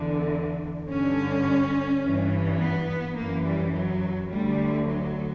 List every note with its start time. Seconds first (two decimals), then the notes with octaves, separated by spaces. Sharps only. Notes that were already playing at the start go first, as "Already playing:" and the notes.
Already playing: E2 D3
0.89 G2 D3 C#4
2.03 G2 E3
2.61 B3
3.17 F#2 E3 A#3
3.46 G3
3.74 F#3
4.31 D2 D3 G3
4.89 F#3